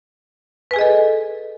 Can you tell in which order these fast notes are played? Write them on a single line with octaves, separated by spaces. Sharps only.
B4 G#5 G#4 D#5 A4